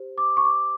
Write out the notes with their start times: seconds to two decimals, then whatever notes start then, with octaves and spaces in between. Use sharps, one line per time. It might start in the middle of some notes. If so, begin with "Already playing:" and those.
Already playing: G4 C5
0.18 D6
0.37 C#6
0.45 D6